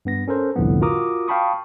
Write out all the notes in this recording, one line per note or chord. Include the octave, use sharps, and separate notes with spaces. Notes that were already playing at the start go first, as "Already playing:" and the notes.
G2 B3 A#6
C#4 A4 A#4 C5
C2 F2 A2 D3 F3 B3
F4 F#4 A#4 A#5 D6 D#6
F5 G5 A5 B5 C#6 D#6